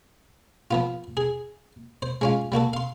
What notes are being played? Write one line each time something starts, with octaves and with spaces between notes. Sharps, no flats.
F3 B3 F4
G#4
C5
G#3 C#4 F4
G3 A#3 F#4 A4
F5 C6